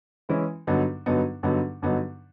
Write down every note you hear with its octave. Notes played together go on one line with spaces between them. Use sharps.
E3 G#3 C#4 E4
G2 D3 F#3 B3 D#4
G2 D3 F#3 B3 D#4
G2 D3 F#3 B3 D#4
G2 D3 F#3 B3 D#4